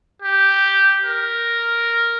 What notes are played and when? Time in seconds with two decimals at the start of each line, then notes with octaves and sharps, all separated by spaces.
0.22 G4
1.05 A#4